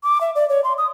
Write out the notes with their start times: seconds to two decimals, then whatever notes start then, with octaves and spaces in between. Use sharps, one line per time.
0.03 D6
0.21 E5
0.35 D5
0.49 C#5
0.64 C6
0.78 D#6